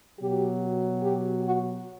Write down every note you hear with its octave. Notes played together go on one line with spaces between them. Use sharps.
B2 F#3 G4
G4
F#4